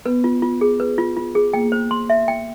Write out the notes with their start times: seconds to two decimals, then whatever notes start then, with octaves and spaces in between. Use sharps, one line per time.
0.06 B3 B4
0.24 F4
0.42 F4
0.61 G#4
0.80 B4
0.98 F4
1.17 F4
1.35 G#4
1.53 A#3 G5
1.72 C5
1.91 C6
2.10 E5
2.28 G5